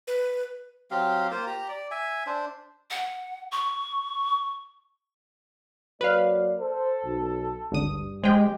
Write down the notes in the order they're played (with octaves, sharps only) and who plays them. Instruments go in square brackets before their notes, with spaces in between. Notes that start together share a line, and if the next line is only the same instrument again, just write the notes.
[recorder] B4
[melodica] F#3 C4 G4 F5
A#3 F4 C5
G4 A#5
D5
E5 G#5
D4 C5
[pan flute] F#5
C#6
[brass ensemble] F#3 A#3 D5 [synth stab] B4 F5
[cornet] A4 [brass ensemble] C5
[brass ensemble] B1
[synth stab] G#1 D2 D#6 [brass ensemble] G2
[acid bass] G#3 [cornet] G4 [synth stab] C5 G5